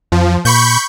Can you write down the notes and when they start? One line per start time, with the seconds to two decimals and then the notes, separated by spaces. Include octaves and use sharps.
0.12 F2 F3
0.45 A#2 B5 C#6 G6